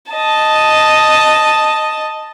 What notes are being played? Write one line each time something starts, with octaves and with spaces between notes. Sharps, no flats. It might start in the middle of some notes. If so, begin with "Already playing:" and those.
D#5 A5